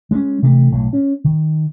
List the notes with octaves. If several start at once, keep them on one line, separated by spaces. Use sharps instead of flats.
G#3 A3 C#4
C3 E3 A3
B1 A2
C#4
D#3